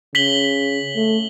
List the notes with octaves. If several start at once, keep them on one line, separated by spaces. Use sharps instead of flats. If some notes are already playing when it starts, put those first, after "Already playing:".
C#3 B6 F#7 G7
A3